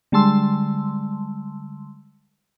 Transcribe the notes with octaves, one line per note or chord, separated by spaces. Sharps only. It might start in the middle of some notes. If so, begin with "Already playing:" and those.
D3 G3 G#3 A5 C6 E6